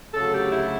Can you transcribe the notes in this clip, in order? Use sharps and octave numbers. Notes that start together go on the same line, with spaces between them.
D2 C#3 F#3 A4
G4
E4